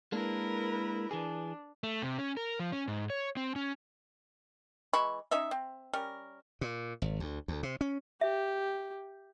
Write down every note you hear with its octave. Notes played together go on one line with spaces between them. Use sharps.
G#3 A#3 D4 E4 A#4 B4
E3 D4 G#4
A3
C3
C#4
A#4
F3
C#4
G#2
C#5
C4
C#4
E3 G#3 B5 C#6
C#4 D#4 D#5 E5
C4
G3 C#4 A#4
A#2
G#1
D2
D2
C3
C#4
G4 E5